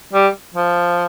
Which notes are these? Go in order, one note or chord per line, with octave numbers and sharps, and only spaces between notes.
G3
F3